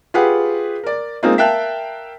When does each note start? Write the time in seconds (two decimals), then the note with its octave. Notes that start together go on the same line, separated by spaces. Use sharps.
0.14 F4 G4 G#4 B4 F#5
0.83 A#4 D5
1.23 G#3 A#3 C4 D#4 F4
1.38 A#4 E5 F5 G5 A5 F#6